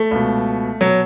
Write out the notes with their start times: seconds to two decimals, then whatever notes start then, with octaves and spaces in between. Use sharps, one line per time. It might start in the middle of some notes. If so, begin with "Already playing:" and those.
Already playing: A3
0.11 C#2 B2
0.80 B2 F#3